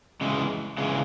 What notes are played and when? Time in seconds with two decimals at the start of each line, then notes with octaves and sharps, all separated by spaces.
0.21 C#3 E3 G#3
0.78 C#3 E3 G#3